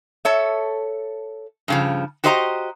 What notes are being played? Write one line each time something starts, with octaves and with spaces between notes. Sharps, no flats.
A4 C#5 E5
G2 C#3 F3
F#4 G4 C5 D#5 G#5 A#5